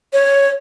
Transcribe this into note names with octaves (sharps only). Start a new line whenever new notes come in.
C#5